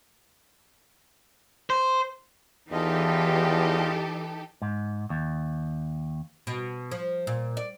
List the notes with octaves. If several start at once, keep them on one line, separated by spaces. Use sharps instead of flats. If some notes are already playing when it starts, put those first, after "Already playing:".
C5
E2 E3 D#4 F4 G4 A4 D#5
G#2
D#2
B2
F3
A#2
D5